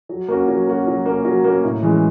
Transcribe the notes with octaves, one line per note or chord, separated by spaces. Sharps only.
F#3
A#3 C#4 F#4
F#3
A#3 C#4 F#4
F#3
A#3 C#4 F#4
F#3
A#3 C#4 F#4
A2
E3 G#3 C#4